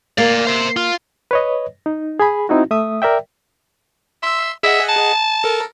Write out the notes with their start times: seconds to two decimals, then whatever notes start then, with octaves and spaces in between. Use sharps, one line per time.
0.18 A#3 D5 F5
0.47 C5 E5
0.77 F4
1.31 B4 C#5 D#5
1.86 D#4
2.20 G#4 G#5 B5
2.49 C4 D#4 E4 F#4
2.71 A3 E5 D#6
3.02 A#4 D5 E5 G5
4.23 E5 C6 E6
4.63 G#4 D#5 E5 F#5
4.89 A5
5.44 A4 A#4